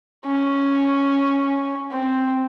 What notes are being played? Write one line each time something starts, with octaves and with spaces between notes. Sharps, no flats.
C#4
C4